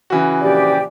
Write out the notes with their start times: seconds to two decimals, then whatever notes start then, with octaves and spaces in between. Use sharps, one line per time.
0.10 C#3 E3 F#4
0.42 A#1 G4 D5